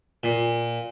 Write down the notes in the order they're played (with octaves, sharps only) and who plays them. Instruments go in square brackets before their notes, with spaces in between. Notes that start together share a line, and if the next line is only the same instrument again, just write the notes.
[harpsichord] A#2